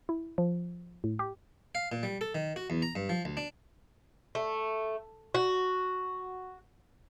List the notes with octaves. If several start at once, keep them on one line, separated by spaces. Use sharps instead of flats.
E4
F3
A2
G4
F5
A#2
G3
A4
D#3
F#4
E2
A#5
G2
F3
D2
D4
A3
F#4